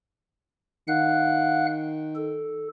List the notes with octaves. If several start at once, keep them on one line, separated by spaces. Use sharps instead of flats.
D#3 F5 F#5 F#6
A4